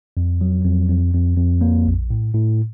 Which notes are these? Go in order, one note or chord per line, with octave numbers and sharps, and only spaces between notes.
F2
F#3
F2
F2
F2
F2
A#3
A#1
A2
A2